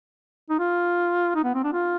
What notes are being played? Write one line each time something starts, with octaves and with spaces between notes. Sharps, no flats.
D#4
F4
D#4
B3
C4
D4
F4